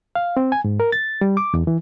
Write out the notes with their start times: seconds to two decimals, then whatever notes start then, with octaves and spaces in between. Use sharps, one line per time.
0.15 F5
0.37 C4
0.52 G#5
0.64 G#2
0.80 A#4
0.92 A6
1.21 G3
1.37 D6
1.54 E2
1.67 E3